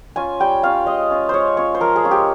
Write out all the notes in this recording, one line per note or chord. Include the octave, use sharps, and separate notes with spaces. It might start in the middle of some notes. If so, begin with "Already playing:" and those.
C#4 F4 G#5
G3 G5
C#4 F4 F5
G#3 D#5
C#4 F4
G#3 C5 C#5
C#4 F4 C#5
C5
F3 A#4
G#4
G#3 C#4 F4
G4